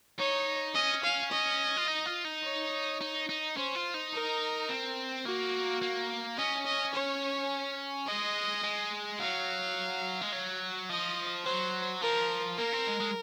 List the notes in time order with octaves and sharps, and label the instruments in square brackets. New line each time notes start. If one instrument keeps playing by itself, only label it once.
[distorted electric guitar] D#4 [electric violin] C#5
[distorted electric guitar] C#4 [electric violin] D#5
[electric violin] F5
D#5
[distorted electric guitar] F4
D#4
F4
D#4
[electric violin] C#5
[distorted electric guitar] D#4
D#4
[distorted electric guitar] C#4 [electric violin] C5
[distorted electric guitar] F4
D#4
[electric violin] A#4
[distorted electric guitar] C4
[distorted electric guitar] A#3 [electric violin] F#4
[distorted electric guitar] A#3
[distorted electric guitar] C#4 [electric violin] D#5
[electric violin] D#5
C#5
[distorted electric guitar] G#3 [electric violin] D#5
[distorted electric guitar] G#3
[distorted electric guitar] F#3 [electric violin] F5
[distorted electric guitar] G#3
F#3
[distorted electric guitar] F3 [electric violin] D#5
[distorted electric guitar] F#3 [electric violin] C5
[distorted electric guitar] F3 [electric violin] A#4
[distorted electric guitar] A#3 [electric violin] A#4
[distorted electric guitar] C4
G#3
G#3